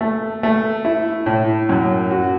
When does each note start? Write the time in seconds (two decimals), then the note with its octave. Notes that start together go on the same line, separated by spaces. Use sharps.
0.01 A3
0.43 A3
0.85 E4
1.26 A2
1.69 F#2
2.11 F#4